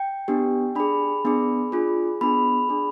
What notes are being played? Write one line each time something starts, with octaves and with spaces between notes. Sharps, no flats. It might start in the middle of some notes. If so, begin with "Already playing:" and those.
Already playing: G5
B3 D4 G4
D4 G#4 B5
B3 D4 G#4
D4 F4 G#4
B3 D4 G#4 B5
D4 G#4